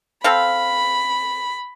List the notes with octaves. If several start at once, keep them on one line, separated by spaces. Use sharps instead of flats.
C4 A4 F5 B5